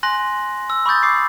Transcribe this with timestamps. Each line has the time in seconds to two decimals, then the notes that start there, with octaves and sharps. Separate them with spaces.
0.03 G#5 C6 F#6 A#6 F#7
0.70 E6
0.86 B5 C#6 D#6 G6 A6
1.03 D6 C7